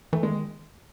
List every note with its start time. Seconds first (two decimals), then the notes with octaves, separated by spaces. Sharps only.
0.13 E3 A3
0.23 D#3 G#3